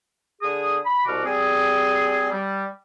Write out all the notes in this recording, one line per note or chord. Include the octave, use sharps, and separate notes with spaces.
D3 G#4 D#6
B5
C2 B2 F#4 D6 F6
G3 C4 G#4
G3